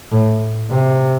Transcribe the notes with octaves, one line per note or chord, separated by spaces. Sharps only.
A2
C3